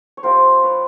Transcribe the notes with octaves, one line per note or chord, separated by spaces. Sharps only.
C#5
G3 C4 F4 A#4 C5
B4 C#5